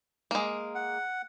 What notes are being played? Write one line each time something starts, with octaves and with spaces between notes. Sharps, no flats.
G#3 A#3
F#5